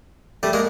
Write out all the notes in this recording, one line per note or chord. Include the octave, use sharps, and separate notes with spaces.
G3 A3
G#3 A#3